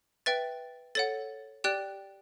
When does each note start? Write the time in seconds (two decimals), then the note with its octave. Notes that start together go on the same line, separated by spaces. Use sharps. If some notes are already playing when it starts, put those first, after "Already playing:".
0.26 B4 E5 G5 A6
0.95 A4 C#5 F#5 A6
1.64 G4 D5 G5 F#6